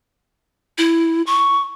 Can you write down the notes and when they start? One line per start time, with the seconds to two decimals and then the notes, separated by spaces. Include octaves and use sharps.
0.78 E4
1.27 C#6